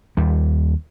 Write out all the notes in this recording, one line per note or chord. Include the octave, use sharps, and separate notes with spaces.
D#2 G3